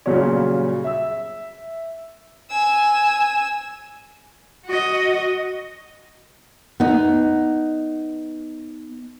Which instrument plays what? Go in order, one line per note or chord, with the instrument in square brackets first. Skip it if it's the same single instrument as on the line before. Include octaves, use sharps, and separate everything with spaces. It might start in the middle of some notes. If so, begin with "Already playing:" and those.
[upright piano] A#2 C#3 F#3 G3 C#4
E5 E6
[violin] G#5 E6
[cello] F#4 D#5
[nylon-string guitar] B3 D#4